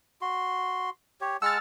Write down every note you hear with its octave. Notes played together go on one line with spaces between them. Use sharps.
F#4 C6
G4 C#5
G#3 F#5 A5 E6 F6 A6